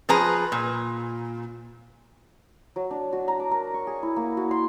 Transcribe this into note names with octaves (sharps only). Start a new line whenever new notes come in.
F3 G#4 B4 A#5
A#2
F#3
D4
F#4
A#5
D6
A#4
C#6
G#4
E4
A#3
F#4
C6